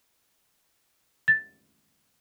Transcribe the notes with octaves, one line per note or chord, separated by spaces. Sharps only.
A6